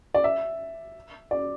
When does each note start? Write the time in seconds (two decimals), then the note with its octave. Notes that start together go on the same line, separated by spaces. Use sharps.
0.14 D5
0.24 E5
1.31 D5